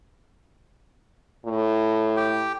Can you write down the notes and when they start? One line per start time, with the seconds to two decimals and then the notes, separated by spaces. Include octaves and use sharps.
1.45 A2
2.17 G4 G5